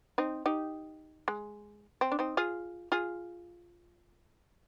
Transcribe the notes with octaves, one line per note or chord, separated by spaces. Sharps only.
C4 D#4
D#4 G4
G#3
C4
D4
C4 D#4
F4 G#4
F4 G#4